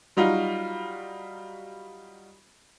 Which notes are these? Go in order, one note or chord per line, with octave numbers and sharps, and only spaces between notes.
F#3 G3 D#4 F4 F#4